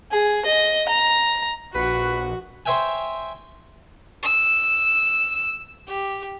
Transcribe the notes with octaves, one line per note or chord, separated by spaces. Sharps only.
G#4
D#5
A#5
A#1 F#4 B4
C5 C#5 E5 G5 G#5
E6
G4